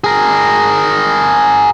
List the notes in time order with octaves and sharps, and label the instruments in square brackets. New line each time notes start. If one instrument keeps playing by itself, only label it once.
[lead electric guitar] G#4 A#4